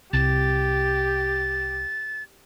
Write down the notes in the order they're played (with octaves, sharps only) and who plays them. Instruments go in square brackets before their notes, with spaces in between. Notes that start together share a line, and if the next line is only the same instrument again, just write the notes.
[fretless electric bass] C2 [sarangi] G4 [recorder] A6